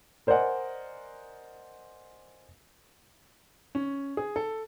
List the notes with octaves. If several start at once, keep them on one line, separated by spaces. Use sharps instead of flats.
A#4 C5 D5 D#5 F#5 G#5
C#4
G#4
A4